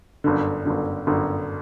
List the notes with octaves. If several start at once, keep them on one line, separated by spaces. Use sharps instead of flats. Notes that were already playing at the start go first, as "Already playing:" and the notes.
G1 F#2 D3
G1 F#2 D3
G1 F#2 D3